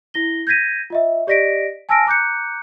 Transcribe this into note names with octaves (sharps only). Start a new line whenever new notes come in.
E4 A#6 G7
G6 G#6 A#6 B6 D#7
F4 D#5 E5
G4 D5 D#5 A#6 B6 D7
G#5 A5 E6 F6 A#6 D7
A#5 D6 F#6 G6 C#7